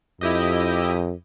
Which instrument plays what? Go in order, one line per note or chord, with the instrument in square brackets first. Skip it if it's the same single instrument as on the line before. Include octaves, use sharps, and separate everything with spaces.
[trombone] F2 [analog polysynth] E4 G4 D#5